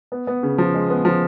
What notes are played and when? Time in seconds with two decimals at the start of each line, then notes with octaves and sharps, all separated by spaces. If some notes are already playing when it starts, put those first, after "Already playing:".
0.12 B3
0.27 B3
0.43 C#3
0.58 F3
0.74 G#3
0.90 B3
1.05 F3